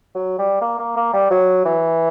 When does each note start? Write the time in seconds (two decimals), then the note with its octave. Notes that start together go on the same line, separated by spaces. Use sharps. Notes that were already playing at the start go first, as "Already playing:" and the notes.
0.15 F#3
0.39 G3
0.61 A#3
0.79 A#3
0.97 A#3
1.13 G3
1.31 F#3
1.65 E3